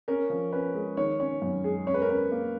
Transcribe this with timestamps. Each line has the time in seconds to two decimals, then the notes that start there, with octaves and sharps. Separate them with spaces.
0.08 C#4 A#4
0.30 F3
0.53 C#4 B4
0.74 G#3
0.97 D#3 C#5
1.20 C#4 C#5
1.42 F#2
1.64 G#3 G#4
1.87 C#4 C#5
1.94 B4
2.02 A#4
2.09 C#4 B4
2.32 A#3